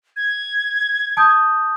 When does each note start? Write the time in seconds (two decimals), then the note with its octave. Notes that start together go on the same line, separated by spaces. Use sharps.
0.16 G#6
1.17 A5 D#6 G6